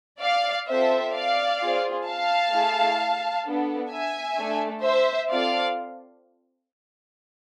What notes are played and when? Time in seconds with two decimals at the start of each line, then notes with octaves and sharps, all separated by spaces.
0.21 D5 F5
0.67 C4 F4 A4 C5 E5
1.14 D5 F5
1.61 C4 F4 G#4
2.06 F5 A5
2.53 A3 E4 G#4
3.45 B3 D4 A4
3.91 E5 G#5
4.37 A3 D4 A4
4.84 C5 E5
5.29 C4 F4 A4 D5 F5